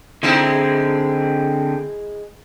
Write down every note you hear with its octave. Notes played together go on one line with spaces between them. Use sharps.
D3 G#3 C4 D#4 E4